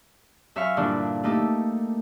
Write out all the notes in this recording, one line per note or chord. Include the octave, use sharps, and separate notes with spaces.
F#2 E5 F5 C#6 F6
G2 A#2 D3 F3 D4 E4
A3 A#3 D#4 G4 A4